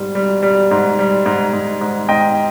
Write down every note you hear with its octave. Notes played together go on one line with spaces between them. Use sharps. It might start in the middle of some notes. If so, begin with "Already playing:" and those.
Already playing: G#2 G3
G3
G3
G#2
G3
G#2
G#2
G#2
G#2 D#5 G5